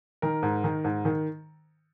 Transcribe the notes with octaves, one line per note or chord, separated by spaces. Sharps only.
D#3 A#4
G#2
D#3
G#2
D#3